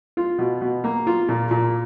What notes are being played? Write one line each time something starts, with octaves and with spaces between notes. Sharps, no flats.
F4
B2
B2
A#3
F4
A#2
A#2